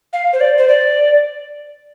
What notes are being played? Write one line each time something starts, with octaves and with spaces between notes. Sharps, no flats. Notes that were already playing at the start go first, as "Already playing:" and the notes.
F5
C5
D5
C5
D5